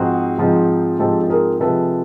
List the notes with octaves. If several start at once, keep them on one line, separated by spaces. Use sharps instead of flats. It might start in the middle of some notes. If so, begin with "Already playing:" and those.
Already playing: G#2 F3 G#3 C4 D#4 F#4 G#4
G#2 F3 G#3 C4 D#4
G#2 F3 G#3 C4 D#4 G4 A4
A4
G#4 A#4
C3 F3 G#3 A4 B4